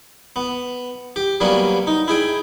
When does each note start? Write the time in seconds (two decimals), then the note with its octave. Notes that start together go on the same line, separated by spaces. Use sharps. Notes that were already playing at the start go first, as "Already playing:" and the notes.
0.36 B3
1.16 G4
1.40 F#3 G3 A#3 B3 C#4
1.87 D#4
2.08 E4 G#4 G5